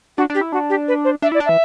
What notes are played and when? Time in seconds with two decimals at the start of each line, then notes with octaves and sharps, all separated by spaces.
0.18 D4 F#4
0.30 D4 G4
0.41 E4
0.52 D4 F#4
0.70 G4
0.88 B4
1.05 C5
1.22 D4 E5
1.32 E4 D5
1.40 D4
1.46 E3 E5